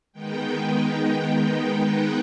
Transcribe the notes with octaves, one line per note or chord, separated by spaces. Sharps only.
D#3 G#3 B3 D#4 G5
F#5